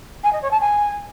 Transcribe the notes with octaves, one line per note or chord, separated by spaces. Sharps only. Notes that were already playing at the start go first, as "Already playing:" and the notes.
G#5
D#5
C#5
A5
G#5